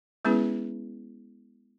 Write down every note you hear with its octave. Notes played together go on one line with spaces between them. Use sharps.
G#3 B3 C#4 E4 G#4 B4